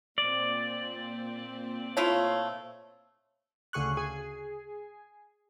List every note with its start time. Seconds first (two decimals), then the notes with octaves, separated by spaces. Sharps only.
0.18 A#2 C4 D5
1.97 A3 E4 F4 C#5
3.73 D2 C#3 G#4 C#6 F#6
3.97 G#4